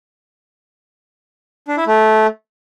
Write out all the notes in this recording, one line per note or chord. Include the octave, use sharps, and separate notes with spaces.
D4
E4
A3